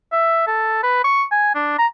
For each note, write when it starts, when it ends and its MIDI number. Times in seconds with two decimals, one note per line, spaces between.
0.13 0.45 76
0.47 0.83 69
0.83 1.01 71
1.04 1.24 85
1.32 1.55 80
1.55 1.78 62
1.79 1.87 82